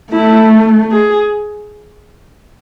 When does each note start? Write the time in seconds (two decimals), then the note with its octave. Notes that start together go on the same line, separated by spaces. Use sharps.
0.13 A3 E4
0.92 G#4